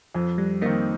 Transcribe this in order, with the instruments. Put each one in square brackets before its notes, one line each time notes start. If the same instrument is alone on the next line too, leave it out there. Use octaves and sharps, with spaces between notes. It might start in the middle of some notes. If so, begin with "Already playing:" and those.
[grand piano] F2 [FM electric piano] F3
[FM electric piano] G3
[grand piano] D#3 C4 D#4 [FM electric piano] A#3